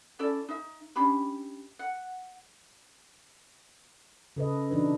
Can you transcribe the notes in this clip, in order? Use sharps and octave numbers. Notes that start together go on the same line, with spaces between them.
C#4 E4 A4 D5
D#4 E5
C#4 D4 G4 B5
F#5
C#3 A4 B4 D#5
B2 E3 D4 D#4 B4